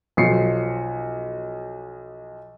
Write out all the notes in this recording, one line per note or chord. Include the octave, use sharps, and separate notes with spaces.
B1 F3 C7 C#7